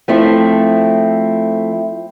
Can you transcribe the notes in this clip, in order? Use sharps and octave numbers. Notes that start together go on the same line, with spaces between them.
F3 A3 C4 E4